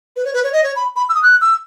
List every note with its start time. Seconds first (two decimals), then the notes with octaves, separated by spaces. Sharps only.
0.16 B4
0.25 C#5
0.34 B4
0.44 C#5
0.53 D#5
0.63 C#5
0.76 B5
0.96 B5
1.09 E6
1.15 D#6
1.23 F#6
1.41 E6